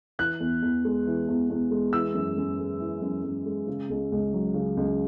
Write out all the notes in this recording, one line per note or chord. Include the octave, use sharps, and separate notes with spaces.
E3 F#6
E2
E2
G#3
E3
E2
E2
G#3
E3 E6
F#2
F#2
G#3
E3
F#2
F#2
G#3
C#3
C#2
C#2
F#3
C#3
C#2